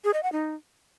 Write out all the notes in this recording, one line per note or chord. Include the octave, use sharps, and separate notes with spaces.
G#4
D#5
F#5
D#4